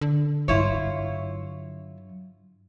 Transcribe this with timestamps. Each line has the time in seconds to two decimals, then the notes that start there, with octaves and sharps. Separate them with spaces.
0.01 D3
0.48 G2 F#3 E4 F4 C#5